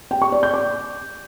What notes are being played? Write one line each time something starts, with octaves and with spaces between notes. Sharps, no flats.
G5
C#6
D5
G6
D6